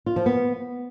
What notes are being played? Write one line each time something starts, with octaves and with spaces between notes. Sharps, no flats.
F4
F3
B3